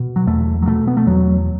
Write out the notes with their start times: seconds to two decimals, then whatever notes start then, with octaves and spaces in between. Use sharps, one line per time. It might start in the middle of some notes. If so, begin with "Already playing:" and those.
Already playing: B2
0.16 F#3
0.27 E2 A3
0.62 F#3
0.67 B2 A3
0.87 B3
0.97 A3
1.07 E2 F#3